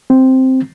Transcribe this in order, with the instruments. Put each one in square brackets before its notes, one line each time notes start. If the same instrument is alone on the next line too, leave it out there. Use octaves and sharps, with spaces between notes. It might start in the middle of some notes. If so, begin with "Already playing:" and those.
[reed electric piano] C4